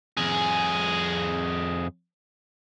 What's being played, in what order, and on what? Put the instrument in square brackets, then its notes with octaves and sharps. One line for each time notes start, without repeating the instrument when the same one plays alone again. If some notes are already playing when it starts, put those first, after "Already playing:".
[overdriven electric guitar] F2 G#4